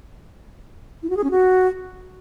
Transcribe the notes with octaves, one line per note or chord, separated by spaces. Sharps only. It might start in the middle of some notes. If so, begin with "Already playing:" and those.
E4
F#4
G#4
C#4
F#4